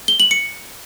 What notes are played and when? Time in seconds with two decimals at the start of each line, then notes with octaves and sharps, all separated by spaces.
0.08 G7
0.20 F#7
0.31 C#7